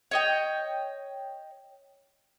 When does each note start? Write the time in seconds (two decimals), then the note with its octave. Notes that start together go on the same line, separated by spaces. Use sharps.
0.11 C#5 D#5 G5